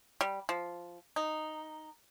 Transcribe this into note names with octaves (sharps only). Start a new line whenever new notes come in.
G3
F3
D#4